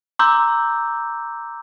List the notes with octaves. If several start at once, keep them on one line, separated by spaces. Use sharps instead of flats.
A#5 C6 D6 E6 G6